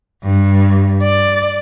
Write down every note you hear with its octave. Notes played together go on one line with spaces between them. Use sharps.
G2
D5